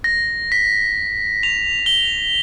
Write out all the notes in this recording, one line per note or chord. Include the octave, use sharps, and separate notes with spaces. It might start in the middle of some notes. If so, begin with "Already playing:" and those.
A#6
B6
F7
G7